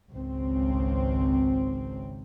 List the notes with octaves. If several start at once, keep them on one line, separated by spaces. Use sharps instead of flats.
G#1 C#2 C4